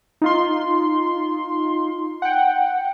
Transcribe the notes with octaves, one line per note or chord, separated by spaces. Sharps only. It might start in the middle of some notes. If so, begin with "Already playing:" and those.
D#4 F4 C6
F#5 G5